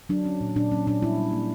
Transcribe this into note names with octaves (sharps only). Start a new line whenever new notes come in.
F#3 D4
C#4
A#2
A#2 D4
F#3 C#4
A#2 D4
G3 E4
G3
A#3